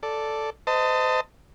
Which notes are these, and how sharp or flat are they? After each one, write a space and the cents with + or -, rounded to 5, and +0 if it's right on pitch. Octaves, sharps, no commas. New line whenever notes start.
A4 +0 D5 -5
C5 -35 D#5 +5 A5 +25